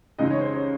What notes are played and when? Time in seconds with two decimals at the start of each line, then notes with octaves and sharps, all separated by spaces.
0.19 C#2 C#3 G#3 D#4 D#5
0.30 C#5
0.41 C5
0.53 C#5